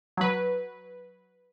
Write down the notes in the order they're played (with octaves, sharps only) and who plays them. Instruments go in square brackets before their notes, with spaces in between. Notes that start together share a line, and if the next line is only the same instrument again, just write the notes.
[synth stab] F#3 B4